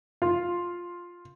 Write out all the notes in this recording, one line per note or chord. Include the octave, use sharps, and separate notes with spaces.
F4